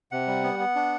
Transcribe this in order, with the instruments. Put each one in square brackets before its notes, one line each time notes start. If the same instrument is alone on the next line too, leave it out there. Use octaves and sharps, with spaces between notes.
[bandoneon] C3 F#5
G3
B3
B3
D4